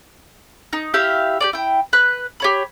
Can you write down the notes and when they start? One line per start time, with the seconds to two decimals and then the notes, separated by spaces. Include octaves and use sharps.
0.73 D#4
0.94 E4 G4 E5 F5
1.40 G4 G#4 D5
1.53 E4 G5
1.93 B4 F#6
2.40 G4 C#5 B5